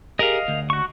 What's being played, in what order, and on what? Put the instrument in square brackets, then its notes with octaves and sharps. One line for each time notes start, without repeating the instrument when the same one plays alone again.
[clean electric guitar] G4 G#4 A#4 [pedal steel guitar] D#5 F5
[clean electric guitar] D2
[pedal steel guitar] F#4 C#6